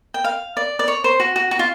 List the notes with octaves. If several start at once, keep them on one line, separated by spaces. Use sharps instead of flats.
G5
F5
D5
D5
C#5
C5
F#4
F#4
F#4
F4